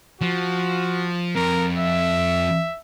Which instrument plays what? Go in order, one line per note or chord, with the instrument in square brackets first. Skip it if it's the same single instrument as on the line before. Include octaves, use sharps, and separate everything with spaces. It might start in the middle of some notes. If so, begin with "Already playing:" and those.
[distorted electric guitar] F3 [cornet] F#4
[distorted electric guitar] F2 [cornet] A#4
[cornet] E5